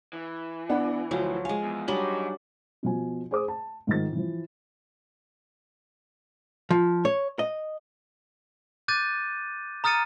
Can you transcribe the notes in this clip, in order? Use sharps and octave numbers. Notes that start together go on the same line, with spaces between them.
E3
B3 D4 F#5
D2 F3 F#3
G#3 F5 G#5
E2
F#3 G3 D4 D#4 G#4 F#7
B2 F3 G#5
G#4 C5 D6 D#6
A5
G#2 D#3 F3 A6
E3 F3
F3
C#5
D#5
D6 F#6 G6 A6 D#7
A#5 D#6 F6 A6 C#7 D#7